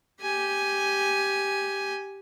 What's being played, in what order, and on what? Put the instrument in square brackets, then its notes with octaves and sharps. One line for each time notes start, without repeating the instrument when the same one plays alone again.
[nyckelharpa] G4 G#5